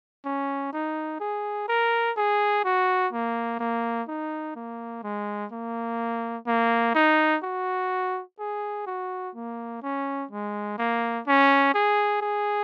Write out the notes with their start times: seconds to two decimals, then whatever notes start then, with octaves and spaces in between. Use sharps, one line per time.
0.25 C#4
0.73 D#4
1.20 G#4
1.68 A#4
2.17 G#4
2.64 F#4
3.12 A#3
3.59 A#3
4.08 D#4
4.56 A#3
5.03 G#3
5.52 A#3
6.47 A#3
6.95 D#4
7.43 F#4
8.39 G#4
8.87 F#4
9.35 A#3
9.82 C#4
10.31 G#3
10.78 A#3
11.27 C#4
11.74 G#4
12.21 G#4